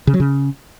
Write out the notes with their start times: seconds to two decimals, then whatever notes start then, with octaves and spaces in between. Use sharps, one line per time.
0.07 C#3
0.14 F#3
0.20 C#3